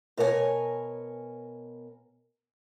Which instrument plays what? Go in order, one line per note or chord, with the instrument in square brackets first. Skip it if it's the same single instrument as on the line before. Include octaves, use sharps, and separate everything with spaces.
[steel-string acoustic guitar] B2 A#4 C#5 E5 G#5